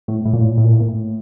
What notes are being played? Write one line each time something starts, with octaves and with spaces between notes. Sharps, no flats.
A2
A2
A#2
A2
A#2
A2
A#2
A2
A#2
A2